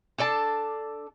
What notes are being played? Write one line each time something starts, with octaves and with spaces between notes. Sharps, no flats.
D4 A4 D5 A5